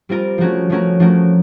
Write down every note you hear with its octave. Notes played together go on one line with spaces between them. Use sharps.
G3 C4 F4 A#4
F3 A3 C#4 F#4 A#4
F3 A3 C#4 F#4 A#4
F3 A3 C#4 F#4 A#4